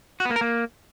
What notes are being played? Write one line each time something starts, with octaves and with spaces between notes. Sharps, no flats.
F#4
B3
A#3
A#4
A#3